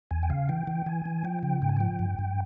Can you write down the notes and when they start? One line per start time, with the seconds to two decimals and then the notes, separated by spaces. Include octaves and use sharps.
0.11 E2 G#5
0.23 G5
0.30 C#3 F5
0.49 E3 G5
0.67 E3
0.86 E3 G#5
1.05 E3
1.24 F3 G5
1.43 C#3 G5
1.62 G#2 G5
1.69 G#5
1.77 F3 G5
1.99 G2
2.19 G2